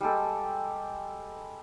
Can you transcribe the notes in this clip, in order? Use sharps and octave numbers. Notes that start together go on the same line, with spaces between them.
G3 G#3 G4 A4